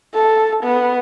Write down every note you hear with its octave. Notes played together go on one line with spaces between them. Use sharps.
A4
B3